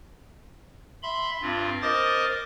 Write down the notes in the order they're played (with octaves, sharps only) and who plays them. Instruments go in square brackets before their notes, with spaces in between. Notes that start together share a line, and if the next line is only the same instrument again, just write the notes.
[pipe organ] E5 B5 C6
G2 C4 F4
A#4 C5 D#5 D6 D#6 A6